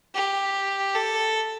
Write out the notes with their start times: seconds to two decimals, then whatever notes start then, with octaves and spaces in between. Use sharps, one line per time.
0.15 G4
0.95 A4